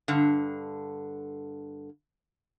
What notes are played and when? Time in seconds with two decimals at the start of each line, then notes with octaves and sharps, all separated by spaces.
0.08 G2 D3